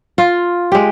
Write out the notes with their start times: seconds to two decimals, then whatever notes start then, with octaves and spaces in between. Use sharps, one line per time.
0.18 F4
0.72 G#3 G4